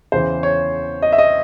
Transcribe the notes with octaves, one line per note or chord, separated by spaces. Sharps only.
E2 C#3 E3 C5
C#5
D#5
E5
D#5